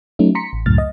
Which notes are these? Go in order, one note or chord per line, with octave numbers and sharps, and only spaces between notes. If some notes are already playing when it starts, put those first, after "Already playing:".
F#3 A3 C#4 D#4
A#5 C6 B6 C#7
A1
C#2 F#2 A2 F6 A6
D#5